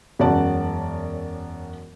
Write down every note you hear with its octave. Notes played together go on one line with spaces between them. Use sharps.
E1 F#2 C#4 F#4 D5 A5